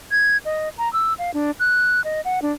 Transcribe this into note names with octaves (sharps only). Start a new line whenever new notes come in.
G#6
D#5
A#5
E6
F5
D4
F#6
D#5
F#5
D4